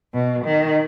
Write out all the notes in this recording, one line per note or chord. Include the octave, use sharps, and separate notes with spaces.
B2
D#3